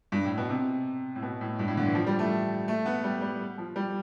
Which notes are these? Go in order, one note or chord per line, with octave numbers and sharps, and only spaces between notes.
G2
A2
B2
C3
A2
B2
A2
G2
A2
D3
E3
F3
G3
A3
A3
B3
G3
G3
F3
G3